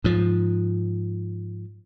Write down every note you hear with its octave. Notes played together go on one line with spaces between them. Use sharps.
G#2 F3